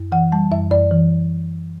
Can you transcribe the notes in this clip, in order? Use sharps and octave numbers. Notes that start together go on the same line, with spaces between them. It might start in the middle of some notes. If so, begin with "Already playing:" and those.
Already playing: F#2
E3 F#5
G3 A5
F#2 E5
F#2 D5
E3